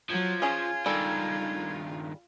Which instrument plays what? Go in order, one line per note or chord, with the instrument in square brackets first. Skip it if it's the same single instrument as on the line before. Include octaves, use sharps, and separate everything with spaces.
[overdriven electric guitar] F3 [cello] F#3 [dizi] G#6
[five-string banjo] C#4 G#4 [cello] F4
[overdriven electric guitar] G2 D#3 [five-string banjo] G3 G#3 A4